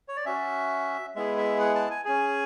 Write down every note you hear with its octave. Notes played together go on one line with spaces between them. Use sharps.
C#5
D5
C#4 F#4 E5
G#3 B3 E4 G#4 E5
E5
F#5
A5
G#5
C#4 G#4 G#5